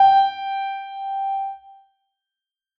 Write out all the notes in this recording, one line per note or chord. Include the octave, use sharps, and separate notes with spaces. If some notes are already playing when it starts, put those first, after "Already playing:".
Already playing: G5